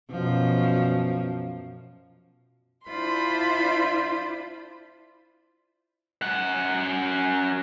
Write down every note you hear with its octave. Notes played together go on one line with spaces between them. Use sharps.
F#2 B2 F3
D4 E4 F4 C5 B5 C6
F#2 F#5